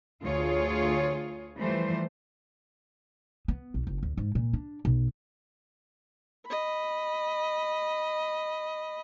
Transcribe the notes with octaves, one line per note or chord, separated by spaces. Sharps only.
D2 F4 G#4 C#5
E3 F3 G3 A3 C5
B3
B1
F#1
D2
G#2
A#2
D4
B1
D#5 B5